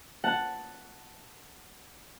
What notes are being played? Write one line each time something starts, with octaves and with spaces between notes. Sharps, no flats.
F#5 A5